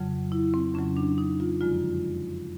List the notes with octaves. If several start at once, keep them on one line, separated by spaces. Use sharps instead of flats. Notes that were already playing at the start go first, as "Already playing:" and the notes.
Already playing: F2 C#3 F#3
E4
C4
F2 C#3 F#3 C#4
D4
D#4
F4
F#2 D3 F3 G#3 F4